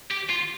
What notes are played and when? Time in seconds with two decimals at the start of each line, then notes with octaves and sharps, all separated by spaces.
0.11 G4
0.30 F4